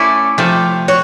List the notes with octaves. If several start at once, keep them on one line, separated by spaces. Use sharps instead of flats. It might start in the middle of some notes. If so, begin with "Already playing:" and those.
Already playing: A3 C#4 E4 D5
C3 F3 A3
F#4 C#5